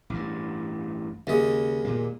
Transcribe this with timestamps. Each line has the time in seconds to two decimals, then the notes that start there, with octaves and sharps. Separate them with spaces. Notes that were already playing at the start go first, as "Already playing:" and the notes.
0.10 A1 G2
1.27 D#2 C#3 G#3
1.85 A#2 A#3